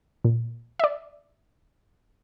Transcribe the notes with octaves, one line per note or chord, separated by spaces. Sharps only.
A#2
D5 E5